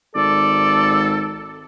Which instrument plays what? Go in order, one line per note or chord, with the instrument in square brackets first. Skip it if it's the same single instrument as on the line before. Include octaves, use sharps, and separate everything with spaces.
[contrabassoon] G#1 [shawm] A4 [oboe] D5